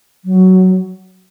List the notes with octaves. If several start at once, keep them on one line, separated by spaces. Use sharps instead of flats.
F#3